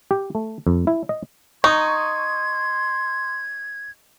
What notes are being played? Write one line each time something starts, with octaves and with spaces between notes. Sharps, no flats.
G4
A3
F2
E4
D#5
D#4 C6 C#6 D#6 G#6